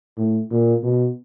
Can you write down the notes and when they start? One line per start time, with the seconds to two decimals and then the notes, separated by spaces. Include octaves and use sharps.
0.17 A2
0.51 A#2
0.83 B2